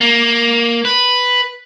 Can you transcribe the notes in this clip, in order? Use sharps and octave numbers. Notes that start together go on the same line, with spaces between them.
A#3
B4